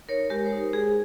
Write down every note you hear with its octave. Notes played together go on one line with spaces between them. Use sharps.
D#4 A#4 C#5
G#3 G4 A#4
C5
D#4
A#4
G#3 G#4